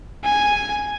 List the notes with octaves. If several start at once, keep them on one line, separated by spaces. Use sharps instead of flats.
G#5